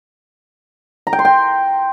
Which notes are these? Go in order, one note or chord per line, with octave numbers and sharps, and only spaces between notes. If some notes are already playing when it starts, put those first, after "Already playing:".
A#5
G5
C6
G5